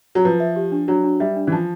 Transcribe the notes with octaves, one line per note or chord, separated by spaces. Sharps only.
F#3
F3 B4
E5
G4
D4
F#3 D4
D4
G3 E5
D4
E3
F3 A5